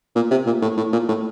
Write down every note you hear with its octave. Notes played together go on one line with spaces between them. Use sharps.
A#2
C3
A#2
A2
A2
A#2
A2